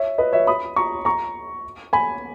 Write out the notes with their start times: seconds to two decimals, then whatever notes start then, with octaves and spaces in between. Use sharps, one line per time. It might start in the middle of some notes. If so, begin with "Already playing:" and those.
Already playing: C#5 E5
0.18 B4 D#5
0.33 C#5 E5
0.47 B5 D#6
0.76 A#5 C#6
1.05 A#5 C#6
1.93 G#5 B5